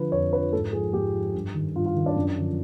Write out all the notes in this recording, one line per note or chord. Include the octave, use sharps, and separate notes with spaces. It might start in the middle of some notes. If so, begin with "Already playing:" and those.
Already playing: D3 F3 B4
F2 C#5
D3 F3 B4
G#2 A4
F3 G#4
G#2 G4
F3
G2
D#3
G2 F4
F4
D#3
D4
F#2
D3 F3